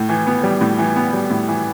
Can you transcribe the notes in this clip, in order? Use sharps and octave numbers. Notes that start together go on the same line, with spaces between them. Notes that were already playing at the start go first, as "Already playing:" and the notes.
Already playing: A2
E3
B3
G3
A2
E3
B3
G3
A2
E3